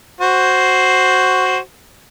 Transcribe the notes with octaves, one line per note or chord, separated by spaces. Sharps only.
F#4 C5